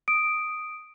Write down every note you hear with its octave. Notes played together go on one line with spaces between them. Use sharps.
D#6 D7